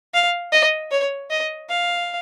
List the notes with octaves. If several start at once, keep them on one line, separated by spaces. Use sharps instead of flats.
F5
D#5
C#5
D#5
F5